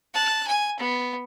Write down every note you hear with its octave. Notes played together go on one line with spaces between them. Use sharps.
A5 F#6
G#5
B3